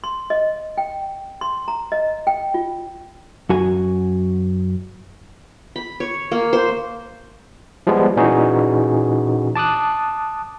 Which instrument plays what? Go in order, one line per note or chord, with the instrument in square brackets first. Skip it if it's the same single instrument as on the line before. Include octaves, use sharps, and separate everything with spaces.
[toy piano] C6
D#5
G5
C6
A#5
D#5
G5
F4
[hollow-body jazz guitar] F#2 F#4 G#5
[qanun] B5
C#5
A#3
C5
[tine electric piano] F3 G3 G#3 B3
A#2 E3 C#4 D#4 F#4 G#4
A5 D6 D#6 F#6